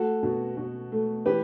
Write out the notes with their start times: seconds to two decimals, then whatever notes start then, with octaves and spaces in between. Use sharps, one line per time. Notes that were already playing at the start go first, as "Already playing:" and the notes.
Already playing: A3 F#4 A4
0.23 B2
0.57 B2
0.92 A3
1.26 E3 G4 B4